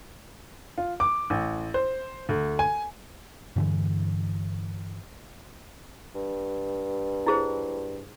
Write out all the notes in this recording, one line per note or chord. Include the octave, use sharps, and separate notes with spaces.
F4
D6
A1
C5
D2
G#5
G2 D3 E3
G2
E4 G#4 C5